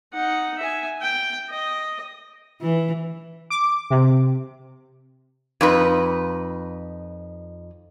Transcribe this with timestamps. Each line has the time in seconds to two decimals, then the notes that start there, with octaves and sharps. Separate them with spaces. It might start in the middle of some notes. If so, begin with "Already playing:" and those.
0.13 D#4 F#5
0.59 E5 G#5
1.02 G5
1.50 D#5
2.61 E3
3.50 D6
3.90 C3
5.61 F2 D#4 B4